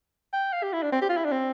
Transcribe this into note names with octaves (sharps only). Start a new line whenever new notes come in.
G5
F5
G4
E4
D4
C4
G4
F4
E4
D4
C4